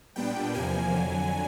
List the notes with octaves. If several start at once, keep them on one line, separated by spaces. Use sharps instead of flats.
A#2 G3 B3 D4 G5
E2 C3 F3 A#3 G#5
F2 D3 F#3